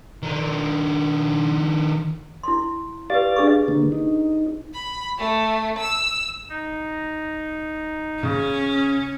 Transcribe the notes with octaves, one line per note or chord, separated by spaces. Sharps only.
D#3 D4
E4 C6
G4 B4 D5 F5 A6
D4 G#4 C#6
D3 A#3
D#4
B5
A3
E6
D#4
C#3 C#4